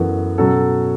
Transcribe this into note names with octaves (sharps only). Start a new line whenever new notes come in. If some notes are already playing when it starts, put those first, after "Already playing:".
Already playing: F#2 E3 B3 F#4 A4
B2 F#3 C#4 F#4 A4